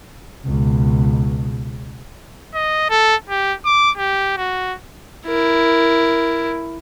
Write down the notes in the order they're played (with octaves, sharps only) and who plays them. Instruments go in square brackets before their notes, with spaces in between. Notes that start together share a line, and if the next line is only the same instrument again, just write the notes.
[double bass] C#2 B2
[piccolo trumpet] D#5
A4
G4
D6
G4
F#4
[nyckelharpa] E4 A#4